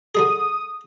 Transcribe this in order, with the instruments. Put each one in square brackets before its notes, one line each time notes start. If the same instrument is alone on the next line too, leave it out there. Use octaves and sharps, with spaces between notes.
[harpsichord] D3 G3 G#4 [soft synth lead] D#6